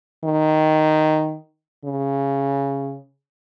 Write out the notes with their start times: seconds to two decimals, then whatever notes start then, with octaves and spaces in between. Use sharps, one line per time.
0.24 D#3
1.85 C#3